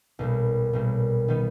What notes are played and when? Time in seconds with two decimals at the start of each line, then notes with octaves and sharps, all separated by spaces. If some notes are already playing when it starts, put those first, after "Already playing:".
0.19 B1 A#2 G3
0.73 B1 A#2 G3
1.28 D#3 G3 B3 D#4